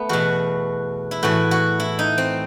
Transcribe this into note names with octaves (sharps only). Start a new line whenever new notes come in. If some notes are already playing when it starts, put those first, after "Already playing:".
Already playing: A3 B3
E2 B2 F#4
E4
A2 E3 F#4
F#4
E4
D#4
C4